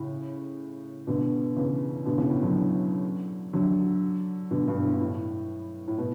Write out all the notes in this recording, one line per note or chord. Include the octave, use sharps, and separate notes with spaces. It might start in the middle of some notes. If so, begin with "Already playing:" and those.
Already playing: A2 C#3
B2 D3
C#3 E3
B2 D3
A2 C#3
A2
D3 F#3
D3 F#3
B2 D3
G2 B2
A2
G2
A2
A2
B2